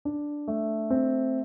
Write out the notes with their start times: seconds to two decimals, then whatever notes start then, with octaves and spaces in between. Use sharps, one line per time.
0.05 D4
0.48 A3
0.90 C4